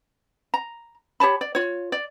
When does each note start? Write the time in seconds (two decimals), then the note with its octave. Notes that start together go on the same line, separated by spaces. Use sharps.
0.54 A#5
1.20 G4 C#5 A5 B5
1.41 D5
1.55 F4 C#5
1.92 D5